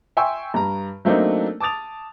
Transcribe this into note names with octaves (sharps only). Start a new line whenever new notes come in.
E5 G5 G#5 C6 C#6 E6
G2 A#5
F#3 A3 A#3 C4 D4 D#4
A5 D6 D#6 A6 F7